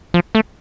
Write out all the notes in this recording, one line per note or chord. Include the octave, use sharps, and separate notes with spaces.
F3
A3